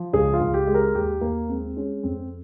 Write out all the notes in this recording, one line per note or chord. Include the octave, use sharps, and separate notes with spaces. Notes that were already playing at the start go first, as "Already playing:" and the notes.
Already playing: F3
C#2 G#4
F4
C#2
G4
G#3
A#4
D#2 G4
D#2 A#3
G#3 C4
G#3 C#4
F2 C4